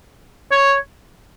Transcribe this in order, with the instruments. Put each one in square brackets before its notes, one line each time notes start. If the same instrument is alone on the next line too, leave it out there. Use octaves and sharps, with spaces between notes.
[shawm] C#5